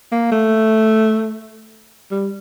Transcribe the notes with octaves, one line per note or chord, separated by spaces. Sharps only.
A#3
A3
G3